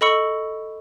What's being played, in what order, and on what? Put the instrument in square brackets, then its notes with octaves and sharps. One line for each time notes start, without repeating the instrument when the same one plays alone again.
[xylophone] A4 D#5 B5 C#6 E6 C#7